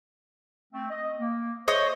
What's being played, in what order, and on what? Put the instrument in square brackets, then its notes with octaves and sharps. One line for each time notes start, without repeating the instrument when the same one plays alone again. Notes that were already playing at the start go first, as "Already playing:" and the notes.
[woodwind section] A3 C4
D#5
A#3
[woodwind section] C5 [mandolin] C#5 D#5